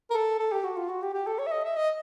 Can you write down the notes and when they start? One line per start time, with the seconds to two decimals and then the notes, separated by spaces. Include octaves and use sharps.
0.10 A#4
0.14 A4
0.39 A4
0.52 G4
0.64 F#4
0.77 F4
0.89 F#4
1.02 G4
1.14 G4
1.27 A4
1.39 C#5
1.46 E5
1.51 D#5
1.64 E5
1.76 D#5